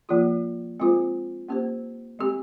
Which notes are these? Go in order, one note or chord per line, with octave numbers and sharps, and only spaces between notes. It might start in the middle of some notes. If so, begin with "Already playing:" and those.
F3 A#3 F4 G#4
G#3 C4 F4 G#4 C5
A#3 C#4 G4 C5
G#3 C4 G4